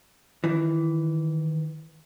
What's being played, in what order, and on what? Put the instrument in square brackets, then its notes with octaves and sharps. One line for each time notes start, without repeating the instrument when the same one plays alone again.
[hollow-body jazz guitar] D#3 E3